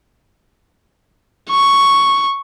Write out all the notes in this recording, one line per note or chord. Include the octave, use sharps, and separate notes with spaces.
C#6